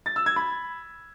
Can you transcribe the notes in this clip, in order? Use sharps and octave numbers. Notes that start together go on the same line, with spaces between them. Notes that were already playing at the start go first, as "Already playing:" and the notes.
A6
E6
G#6
B5